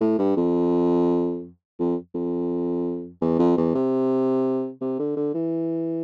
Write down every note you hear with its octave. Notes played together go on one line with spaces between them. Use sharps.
A2
G2
F2
F2
F2
E2
F2
E2
C3
C3
D3
D3
E3